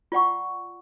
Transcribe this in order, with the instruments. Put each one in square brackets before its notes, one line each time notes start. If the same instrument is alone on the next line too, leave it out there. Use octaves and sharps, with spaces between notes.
[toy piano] F4 D5 F#5 C#6